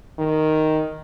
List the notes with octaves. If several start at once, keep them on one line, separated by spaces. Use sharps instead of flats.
D#3